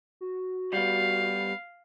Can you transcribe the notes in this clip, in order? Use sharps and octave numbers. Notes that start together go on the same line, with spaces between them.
F#4
G3 B3 F5